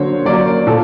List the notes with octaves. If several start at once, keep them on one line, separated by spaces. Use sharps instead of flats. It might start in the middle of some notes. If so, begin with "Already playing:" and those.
Already playing: D3 F#3 A#3 C5 C#5
F#3 A#3 D5
A#2 A4